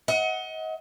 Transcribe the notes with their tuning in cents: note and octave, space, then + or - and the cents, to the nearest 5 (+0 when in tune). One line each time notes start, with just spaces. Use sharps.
D#5 +35 F#5 +0